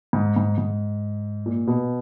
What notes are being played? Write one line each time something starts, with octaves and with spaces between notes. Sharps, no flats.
G#2
G#2
G#2
A#2
B2